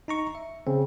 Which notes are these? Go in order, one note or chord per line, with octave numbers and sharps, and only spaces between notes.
D#4 A#5 C#6
E5
C#3 C4